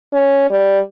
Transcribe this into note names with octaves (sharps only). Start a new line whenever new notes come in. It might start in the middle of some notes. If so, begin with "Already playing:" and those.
C#4
G3